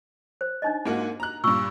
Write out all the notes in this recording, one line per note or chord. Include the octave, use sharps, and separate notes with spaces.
C5
D4 D#4 D#5
G#2 A#3 F#4
A#5 F#6
G2 A#2 C#6 E6